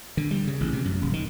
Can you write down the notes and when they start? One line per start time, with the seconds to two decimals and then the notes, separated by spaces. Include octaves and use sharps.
0.17 D3
0.31 G3
0.47 C#3
0.61 A1
0.73 C3
0.85 F#2
1.01 D#1
1.13 D#3